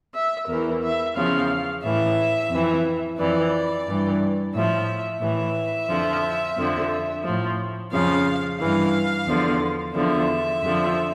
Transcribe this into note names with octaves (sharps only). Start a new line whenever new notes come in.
E5
E2 E3 A#4
E5
E2 C#3 F3 F5
A2 E3 E5
F2 E3
F2 E3 D5
G2 E3
A2 F3 E5
A2 E3 E5
F2 D3 F3
F2 D3 F3
A2 F3
F2 C#3 F3 F5
G2 E3 F5
E2 D3 F3
E2 D3 F3 E5
F2 D3 F3